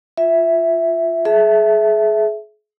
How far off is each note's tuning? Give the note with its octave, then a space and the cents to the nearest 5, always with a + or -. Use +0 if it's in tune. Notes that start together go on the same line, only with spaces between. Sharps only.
F4 +0 E5 +0
G#4 +35 E5 +0 A5 +0